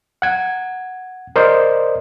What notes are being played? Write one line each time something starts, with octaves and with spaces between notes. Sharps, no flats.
F#5 G#6
A#4 C5 D5 D#5